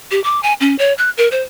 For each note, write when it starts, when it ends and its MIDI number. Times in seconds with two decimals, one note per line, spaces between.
0.11 0.22 67
0.24 0.40 86
0.43 0.54 80
0.60 0.76 61
0.79 0.94 73
0.98 1.10 90
1.17 1.28 70
1.32 1.43 72